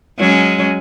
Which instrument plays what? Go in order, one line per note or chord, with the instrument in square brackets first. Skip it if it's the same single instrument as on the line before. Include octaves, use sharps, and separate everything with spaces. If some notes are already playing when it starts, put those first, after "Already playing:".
[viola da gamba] F#3 G#3 C#4